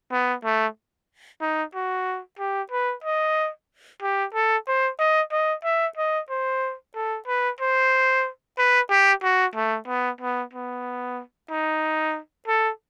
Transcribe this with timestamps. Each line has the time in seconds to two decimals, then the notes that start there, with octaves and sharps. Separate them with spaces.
0.11 B3
0.44 A3
1.41 D#4
1.75 F#4
2.39 G4
2.71 B4
3.04 D#5
4.02 G4
4.34 A4
4.67 C5
4.99 D#5
5.32 D#5
5.64 E5
5.97 D#5
6.29 C5
6.95 A4
7.27 B4
7.60 C5
8.58 B4
8.90 G4
9.23 F#4
9.55 A3
9.88 B3
10.21 B3
10.53 B3
11.50 D#4
12.48 A4